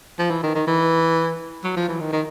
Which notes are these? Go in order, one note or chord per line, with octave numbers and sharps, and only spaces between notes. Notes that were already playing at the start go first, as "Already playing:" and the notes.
F3
E3
D#3
D#3
E3
F#3
F3
E3
D#3
D#3